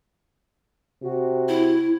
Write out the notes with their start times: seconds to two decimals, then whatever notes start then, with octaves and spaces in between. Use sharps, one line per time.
1.02 C3 F#4
1.49 E4